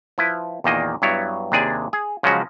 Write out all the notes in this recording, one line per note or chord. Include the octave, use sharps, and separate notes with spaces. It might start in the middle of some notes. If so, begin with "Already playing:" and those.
F3 E4 B4
E2 A#2 D#3 A#3 D#5
G2 F#3 B3 E4 C#5
D#2 C3 D4 G#4 D5 G#5
G#4
C#3 F3 F#3 G#3 C#4 F#4